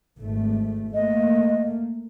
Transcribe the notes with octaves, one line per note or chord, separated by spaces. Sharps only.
G#1 A3
A3 A#3 D#5